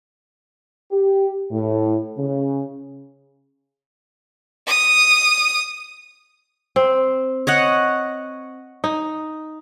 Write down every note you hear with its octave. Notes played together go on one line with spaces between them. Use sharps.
G4
A2
C#3
D#6
C4
C#5 D#5 F#5
D#4